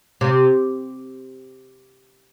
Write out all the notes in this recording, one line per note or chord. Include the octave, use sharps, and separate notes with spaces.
C3